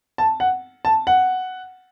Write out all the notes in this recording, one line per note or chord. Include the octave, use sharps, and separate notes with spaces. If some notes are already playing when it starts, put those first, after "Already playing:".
A5
F#5
A5
F#5